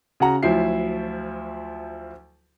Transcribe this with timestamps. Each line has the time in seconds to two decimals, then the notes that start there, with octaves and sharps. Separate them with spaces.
0.20 C#3 F#4 F#5 A#5
0.43 D2 F3 F#3 E4 C7